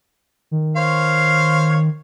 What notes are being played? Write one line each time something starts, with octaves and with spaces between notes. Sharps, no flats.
D#3
C5 C#5 F5